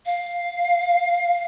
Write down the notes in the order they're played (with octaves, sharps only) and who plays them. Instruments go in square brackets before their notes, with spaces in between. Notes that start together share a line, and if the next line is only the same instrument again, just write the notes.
[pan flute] F5